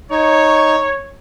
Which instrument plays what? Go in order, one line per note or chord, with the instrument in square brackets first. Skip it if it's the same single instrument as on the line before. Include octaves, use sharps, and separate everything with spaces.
[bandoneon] D#4 [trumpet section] C#5